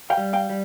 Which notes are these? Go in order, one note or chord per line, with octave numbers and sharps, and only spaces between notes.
F5 G5
G3
F5 G5
G3